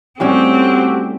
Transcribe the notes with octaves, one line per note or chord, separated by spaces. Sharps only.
A2 G3 A3 C4 C#4 F#4 G4